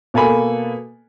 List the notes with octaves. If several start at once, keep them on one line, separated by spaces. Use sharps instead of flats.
B2 A#3 A4 G#5 B5